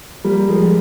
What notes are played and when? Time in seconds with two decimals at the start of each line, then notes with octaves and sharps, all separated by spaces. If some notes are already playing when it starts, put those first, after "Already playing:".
0.24 G3 A#3
0.49 F3 G#3